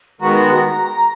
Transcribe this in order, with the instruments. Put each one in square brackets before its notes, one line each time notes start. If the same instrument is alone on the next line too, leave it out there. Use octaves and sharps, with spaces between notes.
[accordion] D#3 G#3 B3 F#4 [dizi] A#5